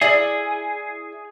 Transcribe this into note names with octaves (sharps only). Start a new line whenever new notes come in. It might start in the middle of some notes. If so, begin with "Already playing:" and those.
E4 G#4 D5 E5